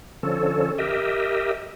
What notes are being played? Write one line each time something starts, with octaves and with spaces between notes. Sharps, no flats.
D3 F3 C#4 A4
G4 A#4 D#5 E5